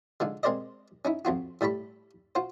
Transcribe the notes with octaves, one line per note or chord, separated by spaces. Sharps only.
D3 F3 G#3
G#3 C4 A#4 C5 D5 D#5
C#4 D#4 E4
F2 C4 F4 F#4
A2 G3 A4 B5 C#6
F4 F#4 C5